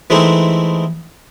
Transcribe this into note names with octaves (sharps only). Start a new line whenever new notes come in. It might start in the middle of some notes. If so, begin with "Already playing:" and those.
E3 G#3 A3 C4 D#4 E4